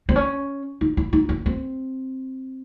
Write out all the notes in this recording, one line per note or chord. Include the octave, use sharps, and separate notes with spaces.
C4
C#4
D#4
E4
D#4
C#4
C4